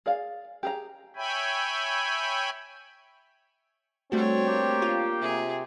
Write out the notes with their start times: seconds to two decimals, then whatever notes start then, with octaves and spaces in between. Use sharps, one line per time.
0.06 G#4 D5 F5
0.63 G4 G#4 A#5
1.16 C#5 E5 G5 G#5 B5
4.12 G3 A3 C4 D4 F#4 C#5
4.48 A#3 G4
4.82 F4
5.21 C3 G#4